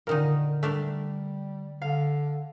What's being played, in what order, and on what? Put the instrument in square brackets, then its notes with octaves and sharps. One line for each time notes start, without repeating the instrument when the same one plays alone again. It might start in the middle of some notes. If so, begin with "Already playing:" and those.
[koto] A#2 D#3 D#4 [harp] D3 A#4
[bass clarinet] G3 [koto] A3 D4 A#4 [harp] B6
[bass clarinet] D3 [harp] F5